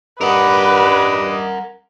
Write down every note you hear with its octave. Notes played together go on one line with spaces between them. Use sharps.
G2 A#4 B4 D#5 F#5 D6